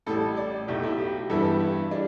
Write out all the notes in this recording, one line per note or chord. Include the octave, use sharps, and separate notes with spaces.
A1 A2 G3 A4
D5
B1 B2 A3 G4
E4
G4
G2 E3 B3 E4 A4
G4
E4
G3 D4